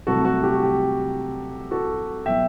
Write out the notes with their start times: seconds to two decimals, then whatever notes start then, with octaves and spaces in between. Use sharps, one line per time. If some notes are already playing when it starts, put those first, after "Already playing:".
0.07 C2 C3 F#3 A3 F#4 A4
0.25 F#4 A4
0.43 G4
0.54 F#4
0.63 G4
1.71 F#4 A4
2.26 B2 F#3 E5 G5